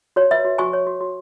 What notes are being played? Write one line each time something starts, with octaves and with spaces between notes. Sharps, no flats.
F#4 C#5
B4 E5
F#4
F#4 G#5 C#6
C#5
F#4
F#4